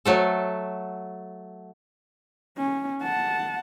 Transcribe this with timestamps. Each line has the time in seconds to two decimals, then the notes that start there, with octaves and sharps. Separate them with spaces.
0.05 F#3 A3 A4
2.58 C#4
3.03 F#5 A5